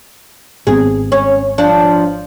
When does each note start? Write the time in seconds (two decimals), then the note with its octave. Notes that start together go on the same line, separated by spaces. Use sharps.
0.67 G#1 B3 C4 G#4
1.12 C#4
1.58 F3 D4